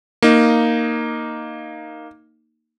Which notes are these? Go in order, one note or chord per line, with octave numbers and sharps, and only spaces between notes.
A#3 D#4